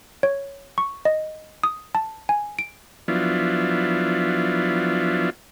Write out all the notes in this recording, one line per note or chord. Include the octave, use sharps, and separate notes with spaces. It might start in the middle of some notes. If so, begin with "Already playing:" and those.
C#5
C#6
D#5
D#6
A5
G#5
D7
F3 F#3 B3 D4 E4 F4